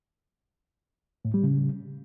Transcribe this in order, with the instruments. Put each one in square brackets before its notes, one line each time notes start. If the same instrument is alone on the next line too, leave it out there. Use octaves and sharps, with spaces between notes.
[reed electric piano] A2
G3
C#3